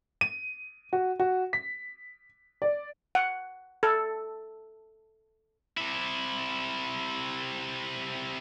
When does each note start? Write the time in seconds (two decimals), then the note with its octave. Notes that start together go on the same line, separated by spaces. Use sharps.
0.21 D#7
0.93 F#4
1.20 F#4
1.53 B6
2.62 D5
3.15 F#5
3.83 A4
5.77 C3 E4